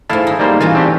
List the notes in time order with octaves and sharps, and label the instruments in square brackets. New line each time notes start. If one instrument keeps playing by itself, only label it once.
[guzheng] G#2 A3 [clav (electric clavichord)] E4 F5 A5
[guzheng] D#4
[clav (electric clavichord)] G3 A#3 C5
[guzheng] E3 C#4 F#4 [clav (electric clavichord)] F4
[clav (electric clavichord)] C4 D4 G4